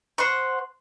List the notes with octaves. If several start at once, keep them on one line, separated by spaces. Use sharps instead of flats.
C5 F#5 C#6